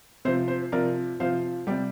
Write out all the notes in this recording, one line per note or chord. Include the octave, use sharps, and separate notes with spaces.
C3 F3 C5
C5
C3 F3 A#4 D5
C3 F3 C5 F5
C3 G3 D5 G5